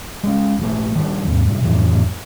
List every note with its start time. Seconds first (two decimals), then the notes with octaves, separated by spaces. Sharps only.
0.23 G#3 C#4
0.59 A#1 E3 A3
0.95 G2 D#3
1.26 D#2 G#2
1.46 G2 B2
1.64 G#1 F2 A2 E3